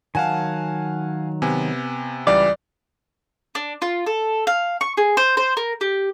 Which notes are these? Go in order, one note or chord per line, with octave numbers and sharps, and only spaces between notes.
D#3 F#3 F5 F#5 G#5 A5
C3 B3 G#5
C#2 E3 G3 D5 D6
D4
F4
A4
F5
C#6
G#4
C5
C5
A#4
G4